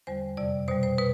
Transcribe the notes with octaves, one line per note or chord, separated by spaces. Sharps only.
E2 D3 G3 C5
F2 C3 G3 D5
B2 G3 C5
C5
B2 B4